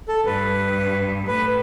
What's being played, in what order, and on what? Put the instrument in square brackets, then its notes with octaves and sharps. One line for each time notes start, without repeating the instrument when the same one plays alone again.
[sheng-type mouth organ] A4
[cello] G2 [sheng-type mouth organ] B4
[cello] A2 [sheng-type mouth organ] B4